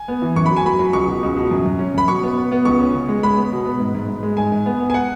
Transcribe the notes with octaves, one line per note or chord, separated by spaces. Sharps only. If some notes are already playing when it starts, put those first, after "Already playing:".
Already playing: G#5
B3
E3
F#2 C#6
B5
F#3
G#5
F#3 B5
F#3
C#2 C#6
B2
C#2
B2
F#2
F#2
C#4
F#2 B5
B2 C#6
B3
B3
B3
C#2 C#6
C#4
C#3
G#3
G#3 B5
B3
B2
B3
G#2
G#2
G#2
G#3
G#2 G#5
G#2
B3
B3
G#5
F#5